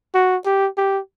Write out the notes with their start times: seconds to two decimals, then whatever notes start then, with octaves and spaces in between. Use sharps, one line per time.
0.14 F#4
0.46 G4
0.78 G4